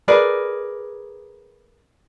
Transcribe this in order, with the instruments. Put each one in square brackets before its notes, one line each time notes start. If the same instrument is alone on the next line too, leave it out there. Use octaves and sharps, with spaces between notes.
[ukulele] G#4 A#4 B4 D5